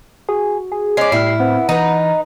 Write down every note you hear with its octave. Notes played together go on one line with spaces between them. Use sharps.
F#4 G#4
G#4
G#3 C#4 D5 C7
A2 G3 E4 F6 C7
B3 C4
E3 D#4 B4 A#5